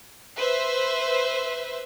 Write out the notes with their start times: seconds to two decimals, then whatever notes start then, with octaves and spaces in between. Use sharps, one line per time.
0.36 B4 C5 E5